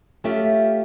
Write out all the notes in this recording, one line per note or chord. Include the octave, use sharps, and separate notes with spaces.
A3 C#4 F4 G4 E5